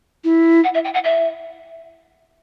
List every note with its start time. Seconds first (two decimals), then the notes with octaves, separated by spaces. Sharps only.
0.24 E4
0.64 F#5
0.74 E5
0.85 G5
0.94 F#5
1.04 E5